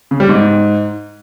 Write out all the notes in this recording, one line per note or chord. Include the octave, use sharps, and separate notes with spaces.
C#3
G3
G#2